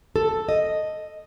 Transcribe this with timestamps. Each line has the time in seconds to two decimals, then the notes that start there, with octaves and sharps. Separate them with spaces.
0.16 A4
0.49 D#5